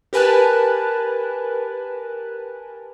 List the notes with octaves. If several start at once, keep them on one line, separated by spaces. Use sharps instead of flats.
G4 A#4 B4 G#5 A5 F#6